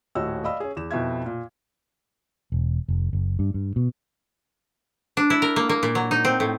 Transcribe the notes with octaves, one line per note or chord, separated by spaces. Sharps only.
D#1 A2 F#4 C#5 D#5 E6
D5 D#5 F5 B5 E6
C#4 G#4
E2 E7
F2 B2 E4 E5 G#6
A#2
E1
F1
F#1
G2
G2
B2
D4
E4
A#4
A#3
A#3
A#2
F#3
D#4
C4
A2